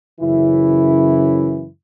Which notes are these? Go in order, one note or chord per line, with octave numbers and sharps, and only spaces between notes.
F#2 C#3 E3 E4